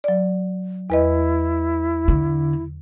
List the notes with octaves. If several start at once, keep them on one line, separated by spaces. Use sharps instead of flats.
F#3 D5
E2 E4 B4 D#5
D3